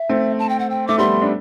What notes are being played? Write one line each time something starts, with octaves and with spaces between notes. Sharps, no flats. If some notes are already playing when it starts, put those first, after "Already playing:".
Already playing: E5
A3 C4
A5
G5
F#5
G5
A3 D6
G3 B3 C6
D4